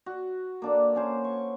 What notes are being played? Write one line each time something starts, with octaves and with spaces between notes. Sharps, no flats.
F#4
A#3 D4 A4
A#3 C#4 C5
C#6